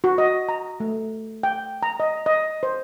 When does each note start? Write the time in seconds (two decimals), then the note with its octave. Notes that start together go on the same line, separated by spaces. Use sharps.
0.04 F#4
0.18 D#5
0.49 A#5
0.80 A3
1.43 G5
1.83 A#5
2.00 D#5
2.26 D#5
2.63 C5